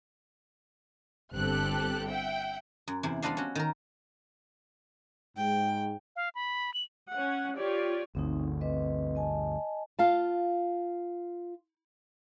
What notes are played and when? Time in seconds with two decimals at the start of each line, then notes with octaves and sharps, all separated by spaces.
1.34 G1 C4 G4 A4 F#6
2.08 E5 F#5 G5
2.88 F#2
3.03 E2 C3 E4
3.22 G3 B3 C4 D4 D#5 F5
3.37 C#4 F#4
3.55 D#3 A#4
5.37 G#2 G5
6.16 F5
6.35 B5
6.74 F#7
7.11 C#4 F#5
7.57 F4 G4 C#5 D5
8.15 G1 D2 C4 D#4
8.61 C4 B4 D#5
9.15 D#5 G#5 A5
9.99 F4 F5 A5